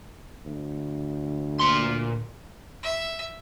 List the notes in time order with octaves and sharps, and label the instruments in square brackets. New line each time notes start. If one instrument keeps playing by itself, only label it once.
[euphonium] D2
[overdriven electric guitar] A#2 C6
[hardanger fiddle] E5